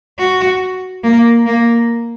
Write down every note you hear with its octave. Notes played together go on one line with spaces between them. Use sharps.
F#4
A#3
A#3